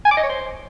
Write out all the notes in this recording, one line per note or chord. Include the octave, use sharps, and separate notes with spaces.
G#5
D6
D#5
C#5
C5